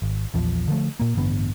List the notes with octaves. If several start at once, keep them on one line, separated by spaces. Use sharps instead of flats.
G#1
A#1 E2 F3
D3 F3 A3
A#2 A#3
A1 G2 D3 B3